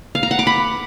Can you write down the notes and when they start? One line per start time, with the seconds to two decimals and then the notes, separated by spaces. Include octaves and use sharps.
0.15 F5
0.23 A#5
0.31 F#5
0.39 D6
0.47 B5